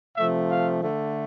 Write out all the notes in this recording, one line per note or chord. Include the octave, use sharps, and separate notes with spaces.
C3 F3 A3 E5
F5
D3 A3